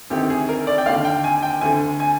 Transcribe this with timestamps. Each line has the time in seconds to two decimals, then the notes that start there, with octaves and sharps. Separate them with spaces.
0.10 D2 C3 D#3 G4
0.30 G#4
0.49 A#4
0.67 D5
0.78 G5
0.86 D#2 D3 F5
1.05 G5
1.24 G#5
1.42 G5
1.61 D2 D3 G#5
2.00 G#5